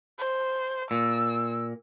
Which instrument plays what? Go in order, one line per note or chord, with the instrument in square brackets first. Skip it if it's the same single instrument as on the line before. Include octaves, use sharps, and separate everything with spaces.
[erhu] C5
[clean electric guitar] A#2 [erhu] E6